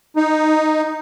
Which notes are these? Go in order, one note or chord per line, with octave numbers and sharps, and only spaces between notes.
D#4